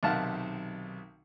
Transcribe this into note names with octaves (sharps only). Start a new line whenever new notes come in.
B1 C3 D#3 F5 F#5 A5